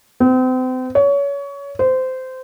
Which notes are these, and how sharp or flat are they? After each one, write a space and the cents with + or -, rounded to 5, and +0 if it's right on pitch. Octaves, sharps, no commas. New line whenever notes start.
C4 -35
C#5 +25
C5 -20